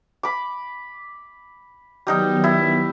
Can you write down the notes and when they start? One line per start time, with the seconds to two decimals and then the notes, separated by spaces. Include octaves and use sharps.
0.23 B5 D6
2.07 D#3 F#3 G3 B3 D#4 G5
2.44 E4